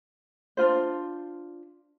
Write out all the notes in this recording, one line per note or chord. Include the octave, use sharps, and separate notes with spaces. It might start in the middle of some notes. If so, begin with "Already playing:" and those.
D4 D#4 F4 C5